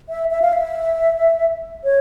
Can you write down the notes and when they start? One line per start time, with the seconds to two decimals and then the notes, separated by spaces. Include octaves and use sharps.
0.09 E5
0.31 E5
0.42 F5
0.53 E5
1.84 C#5